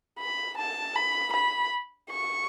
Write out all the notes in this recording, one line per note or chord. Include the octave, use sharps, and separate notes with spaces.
B5
A5
B5
B5
C#6